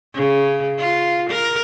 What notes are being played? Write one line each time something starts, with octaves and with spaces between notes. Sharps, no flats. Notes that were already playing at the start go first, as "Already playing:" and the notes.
C#3
F4
A#4